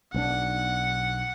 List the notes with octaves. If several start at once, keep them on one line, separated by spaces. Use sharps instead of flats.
B1 C4 D4 F#5